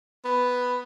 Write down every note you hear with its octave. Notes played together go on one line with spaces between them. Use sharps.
B3